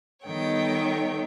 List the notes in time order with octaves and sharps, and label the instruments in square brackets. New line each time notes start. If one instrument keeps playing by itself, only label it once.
[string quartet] D#3 G3 B3 A4 C#5 G5